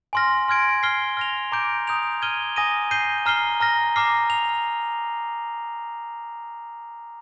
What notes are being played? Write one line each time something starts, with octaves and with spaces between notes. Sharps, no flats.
G#5 C6 F6 A#6
C6 F6 G#6 D7
F6 C7 G7
F6 A#6 F7
A#5 D6 G6 D7
A#5 D#6 G6 D7 F7
F6 G#6 D#7 G7
G#5 D#6 A#6 D#7
G6 C7 D#7 G7
A#5 F6 C7 G7
A#5 F6 A#6
A#5 D6 F6 C7
F7